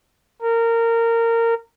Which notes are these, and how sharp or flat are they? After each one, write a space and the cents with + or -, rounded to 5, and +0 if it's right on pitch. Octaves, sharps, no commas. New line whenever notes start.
A#4 -20